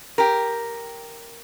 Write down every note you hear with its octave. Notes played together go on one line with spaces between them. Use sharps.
G4 A#4